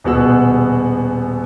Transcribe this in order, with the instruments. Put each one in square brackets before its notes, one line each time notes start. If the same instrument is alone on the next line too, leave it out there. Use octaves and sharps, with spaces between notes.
[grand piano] D#1 B2 B3 F#4 G#4 E6